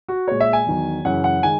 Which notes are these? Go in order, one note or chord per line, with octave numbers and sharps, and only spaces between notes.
F#4
A#2 G#3 C#5
E5
G#5
E2 D#3 F#3
F#2 C#3 E3 F#5
F#5
D#3 G#3 G#5